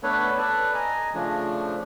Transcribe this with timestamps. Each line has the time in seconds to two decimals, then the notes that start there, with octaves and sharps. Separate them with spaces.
0.03 A3 B3 D4 A4 B4 C#5
0.38 A4 B4 D5 A5
0.74 D#5 G#5 A#5
1.14 C#3 F3 A3 D4